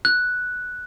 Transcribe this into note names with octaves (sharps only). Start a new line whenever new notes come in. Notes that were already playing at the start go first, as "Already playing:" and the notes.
F#6